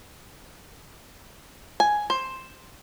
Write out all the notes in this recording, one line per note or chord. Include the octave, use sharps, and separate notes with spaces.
G#5
C5